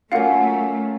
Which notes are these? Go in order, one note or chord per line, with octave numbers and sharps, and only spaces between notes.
F#3 A3 A#3 C#4 F4 F5 F#5